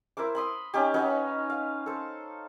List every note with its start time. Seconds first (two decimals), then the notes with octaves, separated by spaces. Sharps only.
0.17 E4 A#4 C5 D6
0.35 B5 C6 D#6
0.74 C#4 D#4 G4
0.94 C#4 D#4 F#4 B4
1.50 F5
1.86 A4 C5